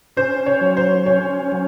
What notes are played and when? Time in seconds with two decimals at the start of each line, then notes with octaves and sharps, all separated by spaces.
0.17 C#4 C5
0.46 C#5
0.61 F#3
0.77 C5
1.06 C#4 C#5
1.52 F#3